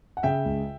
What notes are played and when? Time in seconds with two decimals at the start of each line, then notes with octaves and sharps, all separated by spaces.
0.17 F#5
0.23 C#3 E5 G5
0.45 C#2